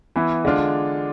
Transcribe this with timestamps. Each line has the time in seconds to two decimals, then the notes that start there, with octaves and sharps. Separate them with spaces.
0.16 E3 B3 E4
0.45 D3 G#3 D4 F4